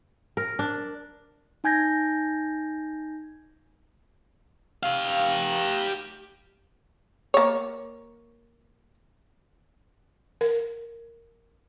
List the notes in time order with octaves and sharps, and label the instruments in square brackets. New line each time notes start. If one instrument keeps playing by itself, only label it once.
[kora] A#4
D4
[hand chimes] D#4 G#5 G6 G#6 A#6
[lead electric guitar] G4 F5
[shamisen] A#3 C#5
[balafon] A#4